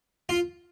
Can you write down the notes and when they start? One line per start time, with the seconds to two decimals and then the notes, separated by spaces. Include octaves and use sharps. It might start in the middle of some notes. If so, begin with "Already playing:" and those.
0.29 F4